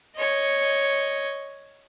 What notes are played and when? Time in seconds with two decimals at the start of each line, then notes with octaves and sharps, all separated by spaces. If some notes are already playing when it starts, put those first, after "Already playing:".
0.16 C#5 D#5